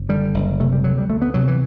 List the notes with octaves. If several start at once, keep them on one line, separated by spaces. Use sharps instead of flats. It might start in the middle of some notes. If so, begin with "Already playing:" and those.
Already playing: F#1
D3 G3
F#1
C3 A3
G3
D2 F#3
G3
D2 A3
B3
C3 F#3
E3